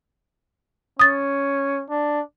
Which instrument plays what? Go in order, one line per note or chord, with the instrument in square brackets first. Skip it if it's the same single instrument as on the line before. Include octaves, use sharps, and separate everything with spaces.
[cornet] C#4 [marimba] D#6 A6
[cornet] D4